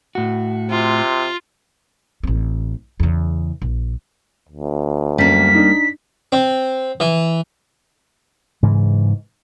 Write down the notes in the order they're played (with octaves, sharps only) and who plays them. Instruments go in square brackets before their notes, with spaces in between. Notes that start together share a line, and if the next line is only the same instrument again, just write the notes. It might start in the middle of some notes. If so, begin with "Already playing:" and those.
[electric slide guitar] A2 F#4
[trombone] C3 [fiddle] F4
[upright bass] A1 C4
E2 C#3
A#1
[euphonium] D2
[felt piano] F#2 [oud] G3 A#3 [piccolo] B6
[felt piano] D4 D#4
[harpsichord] C4
E3
[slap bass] G#2 C#3 E3